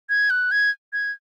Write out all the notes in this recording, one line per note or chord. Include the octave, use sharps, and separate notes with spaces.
G#6
F#6
G#6
G#6